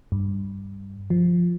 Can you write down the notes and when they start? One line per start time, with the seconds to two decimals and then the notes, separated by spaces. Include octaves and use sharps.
0.12 G2
1.10 F3